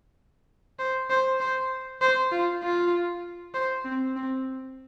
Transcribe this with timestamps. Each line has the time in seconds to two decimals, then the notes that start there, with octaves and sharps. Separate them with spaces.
0.79 C5
1.10 C5
1.41 C5
2.01 C5
2.32 F4
2.63 F4
3.55 C5
3.85 C4
4.16 C4